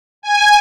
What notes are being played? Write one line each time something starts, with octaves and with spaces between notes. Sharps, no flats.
G#5